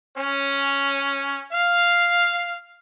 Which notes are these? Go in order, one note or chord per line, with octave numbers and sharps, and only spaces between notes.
C#4
F5